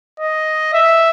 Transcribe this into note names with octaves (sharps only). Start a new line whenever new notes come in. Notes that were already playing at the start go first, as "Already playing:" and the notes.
D#5
E5